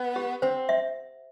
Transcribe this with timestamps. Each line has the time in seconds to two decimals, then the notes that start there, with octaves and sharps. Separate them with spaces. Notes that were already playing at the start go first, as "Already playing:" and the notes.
Already playing: B3
0.16 G4
0.42 C4 C5
0.69 E5